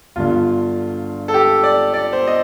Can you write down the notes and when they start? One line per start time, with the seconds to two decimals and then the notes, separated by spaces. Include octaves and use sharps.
0.16 G1 G2 D3 F4
1.28 A4
1.34 G4
1.63 D5
1.94 D5
2.13 C5
2.27 D#5